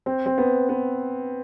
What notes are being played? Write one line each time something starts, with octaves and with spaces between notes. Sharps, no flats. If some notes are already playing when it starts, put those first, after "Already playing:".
C4
C4
B3
B3